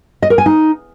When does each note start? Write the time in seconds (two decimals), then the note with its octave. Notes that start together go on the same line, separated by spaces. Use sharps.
0.22 D#5
0.30 A#4
0.38 G#5
0.46 D#4